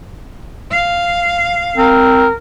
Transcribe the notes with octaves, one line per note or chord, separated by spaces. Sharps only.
F5
C4 A#4